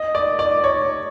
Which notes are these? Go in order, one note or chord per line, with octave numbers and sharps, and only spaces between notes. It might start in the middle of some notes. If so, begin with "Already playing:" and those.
Already playing: D#5
D5
D5
C#5